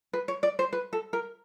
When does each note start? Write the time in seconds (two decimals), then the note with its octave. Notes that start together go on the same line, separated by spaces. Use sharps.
0.13 B4
0.28 C#5
0.43 D5
0.59 C5
0.73 B4
0.93 A4
1.13 A#4